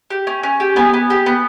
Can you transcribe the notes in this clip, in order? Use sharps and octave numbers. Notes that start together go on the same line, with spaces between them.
G4
C#4
C#4
G4
B3 G#5
B3
G4
B3